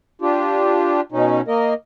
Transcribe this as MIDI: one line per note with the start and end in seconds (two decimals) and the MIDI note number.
0.22 1.01 62
0.22 1.01 65
0.22 1.01 67
1.12 1.41 47
1.12 1.41 61
1.12 1.41 63
1.48 1.73 58
1.48 1.73 70
1.48 1.73 75